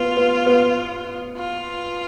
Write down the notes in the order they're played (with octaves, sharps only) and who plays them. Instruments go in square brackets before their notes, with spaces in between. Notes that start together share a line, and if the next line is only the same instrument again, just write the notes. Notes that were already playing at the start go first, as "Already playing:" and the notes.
Already playing: [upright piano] B3 [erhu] F4
[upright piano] B3
B3
[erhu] F4